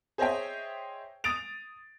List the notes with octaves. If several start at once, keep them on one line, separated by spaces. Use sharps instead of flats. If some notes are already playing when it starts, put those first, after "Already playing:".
G#4 C5 C#5 D#5 E5 G5
D#6 A6 D7 F7